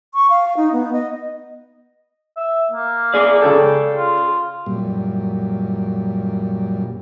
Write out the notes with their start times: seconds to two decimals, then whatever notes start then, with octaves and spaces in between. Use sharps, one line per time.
0.14 C#6
0.30 F5
0.57 D#4
0.72 B3
0.93 D#5
2.37 E5
2.71 A#3
3.14 G#4 D5
3.42 C#3 A4 G5
3.97 F4
4.66 F#2 A#2 G3